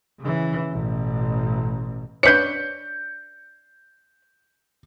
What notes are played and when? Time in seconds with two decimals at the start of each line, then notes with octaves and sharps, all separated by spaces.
0.21 C#3 E3
0.70 A1 B2
2.23 D4 B4 C#5 G6 C#7